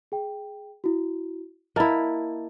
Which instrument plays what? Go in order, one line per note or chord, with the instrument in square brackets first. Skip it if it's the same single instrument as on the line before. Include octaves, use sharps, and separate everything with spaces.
[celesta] G#4 G5
E4 F#4
[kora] A#3 E4 [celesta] D#5 A5 A6